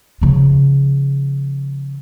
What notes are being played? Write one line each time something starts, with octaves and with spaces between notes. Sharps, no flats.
C#3 F3